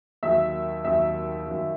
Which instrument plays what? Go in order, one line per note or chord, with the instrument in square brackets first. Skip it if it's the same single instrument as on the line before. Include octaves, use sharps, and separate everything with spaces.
[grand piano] D#2 D#3 F#3 [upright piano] E5
[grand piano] D#2 D#3 F#3 [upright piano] E5
[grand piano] D#2 D#3 F#3